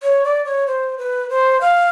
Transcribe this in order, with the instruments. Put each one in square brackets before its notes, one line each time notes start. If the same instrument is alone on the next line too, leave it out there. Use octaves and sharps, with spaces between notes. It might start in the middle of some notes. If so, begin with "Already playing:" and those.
[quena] C#5
D5
C#5
C5
B4
C5
F5